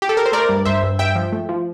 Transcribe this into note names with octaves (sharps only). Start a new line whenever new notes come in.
G4
A4
A#4
C5
A3 A#4 D5
G2
G2 C5 E5
G2
G2 E5 G5
F3
A3
F3